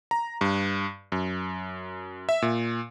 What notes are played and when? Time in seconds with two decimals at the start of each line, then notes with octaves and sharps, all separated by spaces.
0.11 A#5
0.41 G2
1.12 F#2
2.29 E5
2.42 A#2